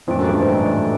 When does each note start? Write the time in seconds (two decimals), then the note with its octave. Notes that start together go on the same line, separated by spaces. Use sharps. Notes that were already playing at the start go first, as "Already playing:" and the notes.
0.07 F2 A2 E3 A3 D4
0.18 F#2
0.29 G2
0.40 G#2
0.51 G#2